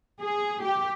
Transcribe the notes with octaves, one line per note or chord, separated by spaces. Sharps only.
G#4
G4